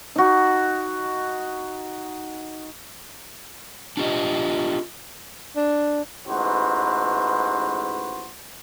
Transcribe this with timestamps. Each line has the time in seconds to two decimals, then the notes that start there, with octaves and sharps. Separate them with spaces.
0.16 D#4 F#4
3.97 D4 F4 G4 D#5
5.56 D4
6.27 A1 G#2 F#4 B4 C5